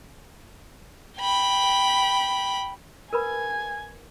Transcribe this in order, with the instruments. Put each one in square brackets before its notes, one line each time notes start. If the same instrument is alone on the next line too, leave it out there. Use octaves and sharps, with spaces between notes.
[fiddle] G5 B5
[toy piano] A#4 B4 B5 [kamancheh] G#5